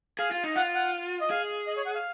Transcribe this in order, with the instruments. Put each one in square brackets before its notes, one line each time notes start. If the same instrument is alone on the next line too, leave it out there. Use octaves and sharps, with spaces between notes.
[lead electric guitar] G#4 [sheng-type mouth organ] F5
[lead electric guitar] F4
D#4
[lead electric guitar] F4 [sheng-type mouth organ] F#5
[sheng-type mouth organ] F#5
D#5
[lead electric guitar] G#4 [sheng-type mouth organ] F5
[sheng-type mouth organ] D#5
C#5
F#5
F5